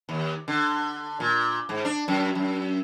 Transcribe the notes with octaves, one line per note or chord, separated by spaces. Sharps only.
D#2
D3
A#2
G#2
D4
F#2
F#2